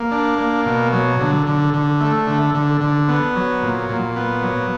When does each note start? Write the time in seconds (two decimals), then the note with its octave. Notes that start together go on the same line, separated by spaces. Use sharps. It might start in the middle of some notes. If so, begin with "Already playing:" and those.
Already playing: A#3
0.11 D4
0.39 A#3
0.66 B2
0.93 F#3
1.20 D3
1.47 D3
1.74 D3
2.00 A3
2.27 D3
2.55 D3
2.81 D3
3.08 B3
3.35 F#3
3.62 A#2
3.89 A#2
4.16 B3
4.42 F#3